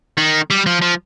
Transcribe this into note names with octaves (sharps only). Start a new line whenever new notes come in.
D#3
G3
F3
F3